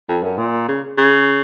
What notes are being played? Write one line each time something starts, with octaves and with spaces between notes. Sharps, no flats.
F2
F#2
A#2
C#3
C#3